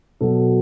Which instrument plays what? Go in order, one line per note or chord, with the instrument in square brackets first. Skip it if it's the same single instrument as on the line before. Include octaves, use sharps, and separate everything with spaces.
[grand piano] B2 F#3 A4